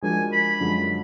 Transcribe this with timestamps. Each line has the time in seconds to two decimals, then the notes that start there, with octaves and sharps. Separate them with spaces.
0.02 F3 G#3 D4 F#4 A#4 G#5
0.32 B5
0.60 F#2 D3 F3 G#3